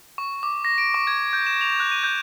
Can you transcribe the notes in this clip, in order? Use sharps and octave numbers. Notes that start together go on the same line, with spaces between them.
C#6
D6
A#6
D7
C#6
G#6
G6
E7
F7
F#6
D#7
G6